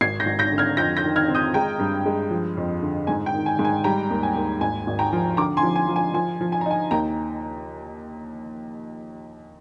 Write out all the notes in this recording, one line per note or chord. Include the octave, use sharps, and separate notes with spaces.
G#1 G#6 C7
G6 A#6
G#1
G6 A#6
D3
F6 G#6
F2 G6 A#6
G6 A#6
D#3
F6 G#6
C4
D#6 G6
G#3 G5 A#5
G2
G#3
F3
F2
D3
G#2 G#5
G5
D#3
G#5
G#2
G#5
G3 G5 A#5
D#2
G#5
D#2
G#1 G#5
G#1
G5 A#5
F3
D3 A#5 D6
G#5 C6
F3
G#5
F3
G#5
F3 G#5
F3
G#5
A#5
D#4 G#5
D#2 G5 A#5